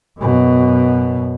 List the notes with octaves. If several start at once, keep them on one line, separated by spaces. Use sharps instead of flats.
F#2 B2